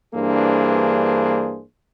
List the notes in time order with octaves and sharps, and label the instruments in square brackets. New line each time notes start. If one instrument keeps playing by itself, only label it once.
[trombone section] G2 E3 A#3 D4 G#4 C5